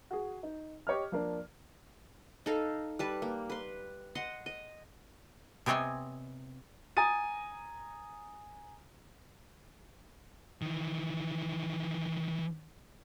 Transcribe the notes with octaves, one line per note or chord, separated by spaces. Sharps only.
F#4 G#4
D#4
G4 C#5 D#5 F6
F3 A#3 D4
D#4 A4 F5
G3 B4 A5
A#3
B4 C6
D#5 F#5 C6
D#5
C3 B3 C4 C#5 D#5 G#5
G#5 A#5 D#6 A6 D#7
D#3 E3